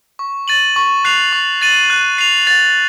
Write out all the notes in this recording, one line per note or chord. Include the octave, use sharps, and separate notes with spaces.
C#6
A6 D#7 F#7
C#6
F#6 C7 F7
C#6
A6 D#7 F#7
F#6
C7 F7
A6